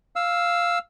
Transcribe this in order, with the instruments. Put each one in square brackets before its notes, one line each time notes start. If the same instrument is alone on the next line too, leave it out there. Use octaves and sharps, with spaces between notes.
[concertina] F5 E6